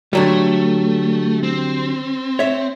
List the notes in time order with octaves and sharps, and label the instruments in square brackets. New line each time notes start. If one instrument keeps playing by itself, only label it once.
[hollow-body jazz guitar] D3 F#3 G3 [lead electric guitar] A3
[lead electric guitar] C4
[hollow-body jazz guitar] C#5 E5